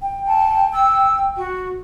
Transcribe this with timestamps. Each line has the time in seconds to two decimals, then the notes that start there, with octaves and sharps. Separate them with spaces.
0.02 G5
0.27 A5
0.72 E6
1.36 F#4